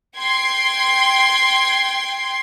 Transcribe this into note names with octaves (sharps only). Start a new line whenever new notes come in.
G5 C6 G#6 C7